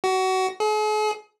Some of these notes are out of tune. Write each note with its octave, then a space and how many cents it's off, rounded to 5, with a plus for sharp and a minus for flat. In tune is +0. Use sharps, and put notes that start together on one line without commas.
F#4 +25
G#4 +45